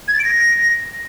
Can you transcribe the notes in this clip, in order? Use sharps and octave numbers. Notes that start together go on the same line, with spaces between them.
G#6
A6
D7
A#6